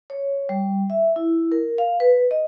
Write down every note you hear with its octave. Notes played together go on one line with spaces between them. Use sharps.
C#5
G3
E5
E4
A#4
F5
B4
D#5